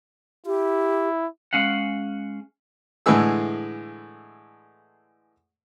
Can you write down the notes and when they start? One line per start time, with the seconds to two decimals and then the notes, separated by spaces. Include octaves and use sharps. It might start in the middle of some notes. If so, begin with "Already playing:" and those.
0.46 E4 G4
1.53 G#3 C#4 F5 F#5
3.06 A2 D3 E3 G#3 G#4 E6